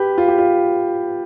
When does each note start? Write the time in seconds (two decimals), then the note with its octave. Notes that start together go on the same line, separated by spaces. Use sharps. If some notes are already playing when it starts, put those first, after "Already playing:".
Already playing: G4 B4
0.18 F4
0.28 G4
0.38 F4